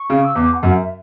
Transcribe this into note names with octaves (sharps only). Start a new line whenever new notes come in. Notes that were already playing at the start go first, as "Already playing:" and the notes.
Already playing: C#6
C#3
E6
E2 D6
F#5
F#2
E5